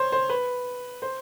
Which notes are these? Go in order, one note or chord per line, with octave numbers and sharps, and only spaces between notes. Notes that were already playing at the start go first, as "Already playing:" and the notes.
Already playing: C5 C#5
C5
B4
C5